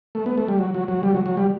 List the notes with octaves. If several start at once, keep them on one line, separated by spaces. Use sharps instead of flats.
A3
B3
A3
G3
F#3
F#3
F#3
G3
F#3
F#3
G3